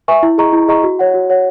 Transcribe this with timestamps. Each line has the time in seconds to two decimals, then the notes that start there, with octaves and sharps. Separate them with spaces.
0.08 B4 E5 G#5 C#6
0.23 E4
0.38 G#4 D#5 A#5 C#6
0.53 E4
0.68 G#4 D#5 A#5 C#6
0.83 F#4
0.99 C#5 F#5
1.14 F#4
1.30 C#5 F#5